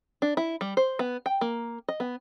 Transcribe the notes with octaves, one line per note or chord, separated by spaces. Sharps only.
D4
E4
G3
C5
B3
G5
A#3
D#5
B3